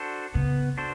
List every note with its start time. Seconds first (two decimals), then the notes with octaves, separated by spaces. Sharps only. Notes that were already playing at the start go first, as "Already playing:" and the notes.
Already playing: D4 F#4 A4 C5
0.34 C#3 B3
0.77 D4 F#4 A4 C5